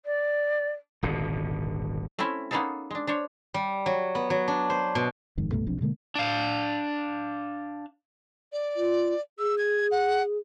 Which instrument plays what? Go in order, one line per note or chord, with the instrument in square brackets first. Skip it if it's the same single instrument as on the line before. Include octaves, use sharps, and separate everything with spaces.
[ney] D5
[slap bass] D#1 G#1 B2 D3
[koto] A3 C4 C#4 E4 E5
A#3 B3 C#4 D#4 G#4 A4
G#3 D4
D4 C5 C#5
[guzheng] G3
F#3
B3
F#3
D4
C5
B2
[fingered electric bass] E1 F2 G#2 D#3
C2 G2 B2 A3
F1 B1 F2 D4
B2 D3 G#3 A#3
[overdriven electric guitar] D4 F5
[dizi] D5
[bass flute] F4
[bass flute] G#4 [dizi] E6
[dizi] G#6
F#5